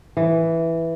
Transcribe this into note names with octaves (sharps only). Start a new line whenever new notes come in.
E3